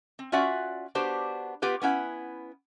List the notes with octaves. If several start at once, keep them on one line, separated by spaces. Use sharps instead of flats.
C4
C#4 F4 F#4 D5 E5 F#5
B3 D4 F#4 G4 C5
B3 F4 G4 B4
B3 C#4 E4 F#5